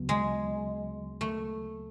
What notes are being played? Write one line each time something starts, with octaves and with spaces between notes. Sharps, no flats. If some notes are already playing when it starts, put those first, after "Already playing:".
Already playing: D2 C#3 F#3 B3
G#3
A3